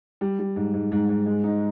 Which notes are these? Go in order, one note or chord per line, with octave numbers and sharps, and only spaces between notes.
G3
G3
G#2
G#2
G#2
G#2
G#3
D#4